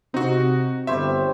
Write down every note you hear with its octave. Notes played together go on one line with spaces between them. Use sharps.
C3 C4 D#4 F#4
G1 G3 C5 C#5 E5